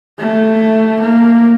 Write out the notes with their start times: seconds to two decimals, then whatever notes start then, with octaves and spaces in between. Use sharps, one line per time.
0.20 A3
1.02 A#3